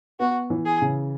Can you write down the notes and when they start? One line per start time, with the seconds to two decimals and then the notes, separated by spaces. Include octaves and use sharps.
0.20 B3 F#4
0.50 E3
0.66 G#4
0.81 C#3